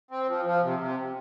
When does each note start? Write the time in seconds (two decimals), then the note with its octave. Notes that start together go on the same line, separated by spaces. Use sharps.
0.11 C4
0.28 F3
0.45 F3
0.62 C3
0.79 C3